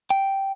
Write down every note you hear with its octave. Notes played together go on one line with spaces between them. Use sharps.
G5